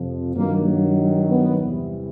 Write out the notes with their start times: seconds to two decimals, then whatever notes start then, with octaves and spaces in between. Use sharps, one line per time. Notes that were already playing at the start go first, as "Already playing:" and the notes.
Already playing: F2 C3 F3
0.35 G2 D#3 F#3 A#3
1.30 B3
1.60 E2 C3 E3 G3